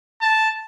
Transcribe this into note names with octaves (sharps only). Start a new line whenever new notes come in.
A5